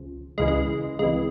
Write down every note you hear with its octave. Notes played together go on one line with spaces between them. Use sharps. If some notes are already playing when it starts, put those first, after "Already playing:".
Already playing: C#2 C#3 F3
C#2 C#3 E3 G#3
G#3
C#2 C3 E3 G#3